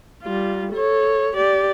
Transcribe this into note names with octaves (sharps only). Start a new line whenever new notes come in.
G3 F4
A4 C#5
G4 D5